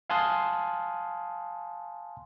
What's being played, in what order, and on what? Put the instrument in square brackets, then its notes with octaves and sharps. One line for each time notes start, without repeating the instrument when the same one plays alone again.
[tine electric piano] F5 G#5 A5 C6 D#6 F#6